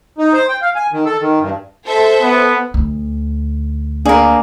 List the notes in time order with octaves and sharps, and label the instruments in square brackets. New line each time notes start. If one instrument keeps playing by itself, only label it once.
[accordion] D#4
C5
G5
F5
G#5
D#3
A4
D#3
G2
[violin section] A4 C5 E5
[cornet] B3
[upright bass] D2
[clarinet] A#3 [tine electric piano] D4 D5 [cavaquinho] G#4 A#4